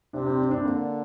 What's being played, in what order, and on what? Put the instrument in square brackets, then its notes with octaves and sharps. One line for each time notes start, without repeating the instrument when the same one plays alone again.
[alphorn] C3 [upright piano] D4
[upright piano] C4
D4
D4
C4
[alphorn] D3 [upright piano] A#3